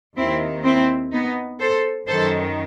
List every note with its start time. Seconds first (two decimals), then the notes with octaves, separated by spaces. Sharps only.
0.16 D#2 D#3 C4 E4
0.64 C4 E4
1.12 B3 D#4
1.59 A4 C5
2.07 F#2 D#3 A4 C5